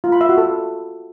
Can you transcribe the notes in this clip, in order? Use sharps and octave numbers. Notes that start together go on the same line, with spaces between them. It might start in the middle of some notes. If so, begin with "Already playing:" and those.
F4
B5
E5
F#4
A4